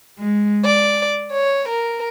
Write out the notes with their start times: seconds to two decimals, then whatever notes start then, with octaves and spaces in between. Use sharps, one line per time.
0.18 G#3
0.64 D5
1.31 C#5
1.68 A#4